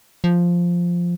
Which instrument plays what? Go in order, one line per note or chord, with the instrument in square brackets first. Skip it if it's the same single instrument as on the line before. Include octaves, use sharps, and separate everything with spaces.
[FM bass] F3